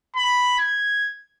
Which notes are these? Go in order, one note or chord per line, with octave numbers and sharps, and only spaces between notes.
B5
G#6